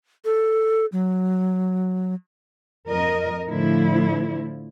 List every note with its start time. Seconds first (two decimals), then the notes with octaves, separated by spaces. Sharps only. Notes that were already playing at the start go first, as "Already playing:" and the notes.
0.25 A4
0.92 F#3
2.89 F2 A#4 D#5
3.49 A2 D3 F3 E4